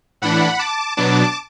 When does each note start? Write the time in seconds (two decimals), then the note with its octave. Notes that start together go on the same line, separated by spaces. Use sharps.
0.22 A2 E3 D4 F#5 B5
0.59 A5 D6
0.97 B2 F#3 B3 D4 A5 D6